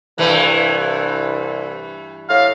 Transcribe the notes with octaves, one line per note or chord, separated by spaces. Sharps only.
C2 G2 E3 A3
A2 F5